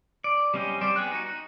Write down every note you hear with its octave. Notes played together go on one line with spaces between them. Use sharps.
D5
G3 C4 C#4 D#5 G5
G3 C5 D5
B3 G#4 G5 F#6
D#4 F#4
D#4